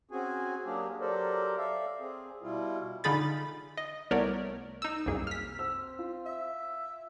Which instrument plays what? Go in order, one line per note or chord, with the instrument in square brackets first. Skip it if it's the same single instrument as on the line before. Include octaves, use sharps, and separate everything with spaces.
[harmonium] C4 C#4 F#4 G#4 G#5
F#3 A#3 D4 G4 G#4
F#3 G4 A4 A#4 C5 D5
A4 D5 E5 F5
C4 G#4
B2 G3 E4 F4
[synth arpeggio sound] D3 D#4 F4 G#4 B5 A6
D#5
C2 A3 B3 A#4 C#5 D5
D#4 E6
C2 F#2 A#3 G#4
F6 B6
[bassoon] C4 [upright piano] E6
[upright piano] F4
[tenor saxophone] E5